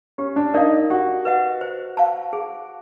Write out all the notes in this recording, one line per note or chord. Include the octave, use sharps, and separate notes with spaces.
C#4 G4
D4
D#4 A#4 D5 F5
F#4 G4
B4 D#5 F#5
C5
F5 A5
G#4